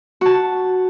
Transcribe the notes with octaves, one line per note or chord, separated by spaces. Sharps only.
F#4 A5